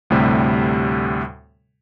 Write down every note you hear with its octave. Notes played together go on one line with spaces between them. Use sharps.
D2 A2 C3 G3